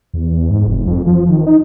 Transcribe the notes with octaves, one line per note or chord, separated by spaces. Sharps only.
E2
G#2
F1
F2
F3
D#3
D#4